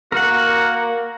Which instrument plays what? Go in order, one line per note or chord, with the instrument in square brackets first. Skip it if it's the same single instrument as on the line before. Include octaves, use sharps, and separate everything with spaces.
[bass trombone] A#3 [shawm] F#4 [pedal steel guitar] A#4 F#5